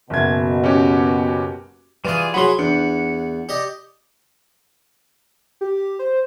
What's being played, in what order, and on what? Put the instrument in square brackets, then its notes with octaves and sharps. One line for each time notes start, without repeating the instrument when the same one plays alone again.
[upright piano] F#1 G#6 [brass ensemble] B2
[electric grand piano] C#4 F#4 G4
[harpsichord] E3 F5 [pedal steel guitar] G3 F4 G#4
[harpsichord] F#3 G#4 [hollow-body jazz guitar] F#4 C#5 F#5 [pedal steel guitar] B5 C6
[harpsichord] E2 [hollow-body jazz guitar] D4 [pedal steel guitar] F#5
[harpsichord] G4 D5 D#5
[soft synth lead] G4
C5